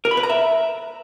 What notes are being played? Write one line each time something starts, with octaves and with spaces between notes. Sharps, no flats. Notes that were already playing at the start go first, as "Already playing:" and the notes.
A#4
B5
B4
A#5
E5